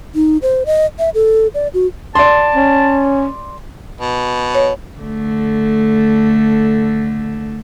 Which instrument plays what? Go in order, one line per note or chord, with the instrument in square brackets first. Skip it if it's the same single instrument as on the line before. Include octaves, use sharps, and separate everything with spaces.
[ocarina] D#4
C5
D#5
E5
A4
D5
F#4
[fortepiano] D5 C6 [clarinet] A5
[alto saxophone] C#4
[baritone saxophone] B2
[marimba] C#5
[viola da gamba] D3 A3